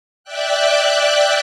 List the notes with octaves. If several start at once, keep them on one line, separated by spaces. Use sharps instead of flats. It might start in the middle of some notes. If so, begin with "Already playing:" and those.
D5 E5 G5 F#6